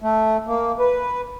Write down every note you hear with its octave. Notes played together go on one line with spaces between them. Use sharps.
A3
A#3
B4